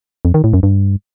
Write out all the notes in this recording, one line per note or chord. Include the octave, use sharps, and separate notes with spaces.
F2
D#3
A2
F#2
G2